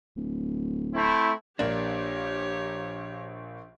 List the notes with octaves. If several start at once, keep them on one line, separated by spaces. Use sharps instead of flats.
D1
A3 C4 E4
A#1 A#3 D4 G4 C#5